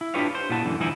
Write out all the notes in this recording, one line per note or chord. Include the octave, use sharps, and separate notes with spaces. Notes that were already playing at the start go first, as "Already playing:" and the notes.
E4
D4 F4 G4 B4 C#5 F5
C5
A#2 B3 E4 F#4 A5
F#2 D3 E3
D2 G2 E3 F3 D#4 E4